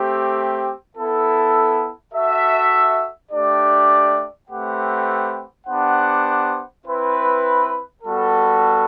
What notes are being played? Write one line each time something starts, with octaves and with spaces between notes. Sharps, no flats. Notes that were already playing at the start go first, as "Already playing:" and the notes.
Already playing: A3 C4 G4
B3 E4 A4
F#4 A4 E5
A3 D4 G4 D5
A3 C4 G4 B4 F#5
B3 D4 G4 C5 F#5
C4 E4 B4
G3 B3 F#4 A4